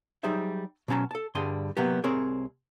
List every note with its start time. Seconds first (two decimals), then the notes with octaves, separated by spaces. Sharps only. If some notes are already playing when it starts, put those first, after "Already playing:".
0.23 F#3 G3 D#4 G#4 C5 E5
0.88 B2 F#3 C#4 A5 A#5
1.11 A4 A5
1.35 G2 D3 G3 G#4 C6
1.77 C3 F#3 A#3 B3 G4
2.04 C2 C4 G#4 A#4 C#5